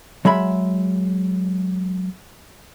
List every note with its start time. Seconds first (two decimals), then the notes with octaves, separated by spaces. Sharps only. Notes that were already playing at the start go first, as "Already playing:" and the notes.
0.25 F#3 G#3 E5 B5